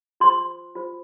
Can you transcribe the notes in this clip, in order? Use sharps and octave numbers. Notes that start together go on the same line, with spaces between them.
F4 C5 C6
F4 C5